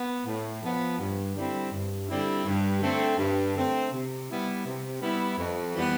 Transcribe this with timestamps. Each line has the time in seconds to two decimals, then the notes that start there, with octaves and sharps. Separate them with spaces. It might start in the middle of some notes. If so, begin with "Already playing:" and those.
Already playing: B3
0.26 A2
0.62 F3 B3
0.99 G2
1.35 D3 G3 C4 E4
1.71 G2
2.08 D3 G3 C4 E4
2.45 G2
2.81 D3 A3 C4
3.18 G2
3.55 D3 A3 C4
3.92 C3
4.29 G3 B3 E4
4.65 C3
5.02 G3 B3 E4
5.38 F2
5.75 E3 G3 B3